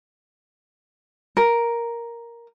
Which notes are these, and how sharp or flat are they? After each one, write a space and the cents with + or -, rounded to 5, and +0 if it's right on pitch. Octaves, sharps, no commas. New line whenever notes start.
A#4 +5